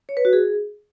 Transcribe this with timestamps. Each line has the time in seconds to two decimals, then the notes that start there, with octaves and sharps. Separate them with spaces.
0.09 C#5
0.17 B4
0.25 F#4
0.33 G#4